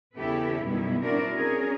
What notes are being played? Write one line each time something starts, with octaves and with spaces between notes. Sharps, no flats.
E2 C#3 E4 G4 A4 B4
F#2 B2 D#3 G3 B3 E4
C4 D4 E4 F#4 A#4 D5
C#4 G#4 A#4